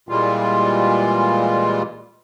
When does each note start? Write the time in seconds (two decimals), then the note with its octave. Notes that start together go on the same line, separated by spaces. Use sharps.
0.09 A#2 E3 G3 G#3 F4